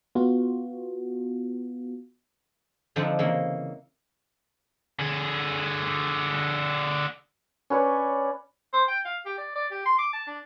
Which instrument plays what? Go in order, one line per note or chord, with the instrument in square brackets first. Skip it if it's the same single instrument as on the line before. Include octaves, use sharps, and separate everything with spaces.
[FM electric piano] B3 F4 F#4
[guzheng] D3 F3 C4 D4 D#4
C#3 E3 A#3
[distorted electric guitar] D3 G#4
[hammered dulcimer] C#4 B4 C#5 D5
[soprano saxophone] C5
G5
F5
G4
D5
D5
G4
C6
D6
A5
D4